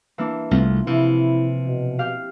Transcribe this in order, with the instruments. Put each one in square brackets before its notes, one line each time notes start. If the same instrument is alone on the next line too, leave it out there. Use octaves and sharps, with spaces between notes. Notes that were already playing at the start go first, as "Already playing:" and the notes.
[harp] E3 A#3 D4
[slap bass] C2 A3 [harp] C4 F4
[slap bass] C3 [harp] E3 F3 [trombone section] E4
[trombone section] B2
[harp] G4 F5 F6